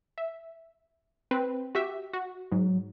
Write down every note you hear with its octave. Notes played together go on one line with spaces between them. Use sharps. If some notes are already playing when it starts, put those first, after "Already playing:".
E5
C4 B4
F#4 G4 E5
F#4
G#2 F#3